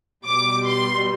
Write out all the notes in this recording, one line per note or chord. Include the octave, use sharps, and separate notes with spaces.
B2 G3 D6
C6